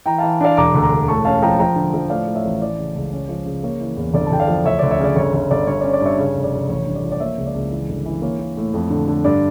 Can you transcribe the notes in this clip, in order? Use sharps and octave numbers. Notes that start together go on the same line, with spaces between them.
E3 G5 A#5
E3 F5 A5
D4 D5 F5
E1 A#5 D6
D2
A#5 D6
E1
A2 A5 C#6
C#4 F5 A5
F3 G5 A#5
F3 G5 A#5
D3
F3
A2 D5 F5
A2
C#5 E5
A1
E3 D5
C#3
C#2
C#4
F3
C#3
A#3 C#5
E3
E2
G1 D5
A5
G1 G5
D5 F5
F3
D2 C#5 E5
D2 D5
C#5 E5
C#3 D5
G1 C#5
G1 C#5
G1 D5
G2 C#5
C#4 D5
D5
G2 C#5 E5
C#3 C#5
F1
D5
F1
A1 C#5
G2
D5
F3
D5
A#3 C#5 E5
C#2
D5
C#2
E3
G1
E3
A#3 C#5
A#3
A2
F2
D3
D3
G2 D5